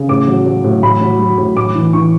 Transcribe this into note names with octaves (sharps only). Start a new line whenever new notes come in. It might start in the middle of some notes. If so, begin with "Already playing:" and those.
Already playing: C#3
A2 D6
F#3
F#3
A2
A2 B5
F#3
F#3
A2
A2 D6
E3
E3 C#6